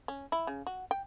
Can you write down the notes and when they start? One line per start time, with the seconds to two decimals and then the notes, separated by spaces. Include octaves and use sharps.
0.08 C#4
0.32 E4
0.47 C#3
0.67 F#4
0.91 G5